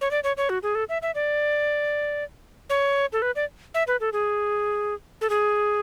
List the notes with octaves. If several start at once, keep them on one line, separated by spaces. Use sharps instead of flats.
C#5
D5
C#5
C#5
F#4
G#4
A4
E5
E5
D5
C#5
A4
B4
D5
E5
B4
A4
G#4
A4
G#4